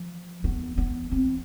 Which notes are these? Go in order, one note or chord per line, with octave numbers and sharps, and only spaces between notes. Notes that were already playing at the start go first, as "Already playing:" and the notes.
Already playing: F3
B3
B3
C4